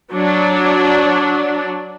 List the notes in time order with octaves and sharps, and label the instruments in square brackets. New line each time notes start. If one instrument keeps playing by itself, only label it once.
[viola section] F#3 D4